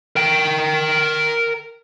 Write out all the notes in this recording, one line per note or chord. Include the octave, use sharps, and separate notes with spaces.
A#4 G5